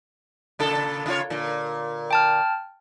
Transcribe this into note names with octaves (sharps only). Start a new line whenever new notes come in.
A#2 C#3 A4
C#3 F4 C#5
A#2 D3
G5 A5 F6